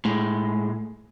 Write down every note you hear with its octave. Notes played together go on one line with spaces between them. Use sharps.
A2 G#3